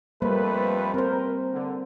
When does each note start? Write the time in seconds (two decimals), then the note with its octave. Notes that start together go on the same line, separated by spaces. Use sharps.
0.22 F2 G3 A3 A#3 B4 C5
0.94 C4 A#4 C5
1.53 D3